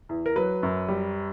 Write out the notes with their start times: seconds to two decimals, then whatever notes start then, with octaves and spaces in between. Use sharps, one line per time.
0.09 E2
0.26 A#4
0.36 F#3 B4
0.63 F#2
0.88 G3